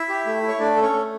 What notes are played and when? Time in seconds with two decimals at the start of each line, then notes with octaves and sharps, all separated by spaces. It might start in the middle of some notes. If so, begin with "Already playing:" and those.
Already playing: E4 E5
0.09 G4
0.26 A3
0.43 E4
0.48 C#5
0.59 A3 D4 D5
0.76 A4
0.82 C#4 C#5
0.93 A3